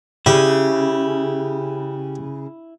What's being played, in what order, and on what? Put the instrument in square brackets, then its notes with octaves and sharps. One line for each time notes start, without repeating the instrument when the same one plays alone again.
[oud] C#3 [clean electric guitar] E4 [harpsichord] G4